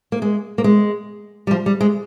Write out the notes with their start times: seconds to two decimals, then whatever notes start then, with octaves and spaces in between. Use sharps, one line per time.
0.12 A#3
0.22 G#3
0.58 A#3
0.64 G#3
1.47 G3
1.51 F3
1.66 G3
1.81 G#3